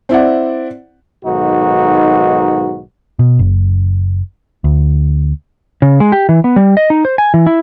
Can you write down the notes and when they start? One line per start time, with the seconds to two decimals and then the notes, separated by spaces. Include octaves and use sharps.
0.09 C4 E4 D5 F#5
1.25 B1 G#2 D#3 D#4 F#4
3.19 B2
3.39 F#1
4.64 D2
5.82 C#3
6.00 G#3
6.12 G4
6.29 E3
6.44 B3
6.56 G3
6.77 D#5
6.90 D#4
7.05 C5
7.18 G#5
7.34 E3
7.47 E4